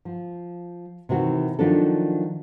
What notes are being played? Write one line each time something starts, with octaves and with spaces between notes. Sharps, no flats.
F3
C3 D#3 E3 F#4
D#3 F3 F#3 D4 F4 A4